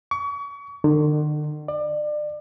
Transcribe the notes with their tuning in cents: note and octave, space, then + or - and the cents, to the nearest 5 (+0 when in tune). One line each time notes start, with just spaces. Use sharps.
C#6 +35
D3 +45
D5 +30